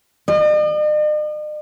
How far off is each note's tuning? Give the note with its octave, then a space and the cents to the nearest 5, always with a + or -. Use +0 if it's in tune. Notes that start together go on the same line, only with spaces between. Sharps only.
D#5 -45